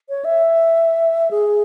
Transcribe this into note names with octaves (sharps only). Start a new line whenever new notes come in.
C#5
E5
G#4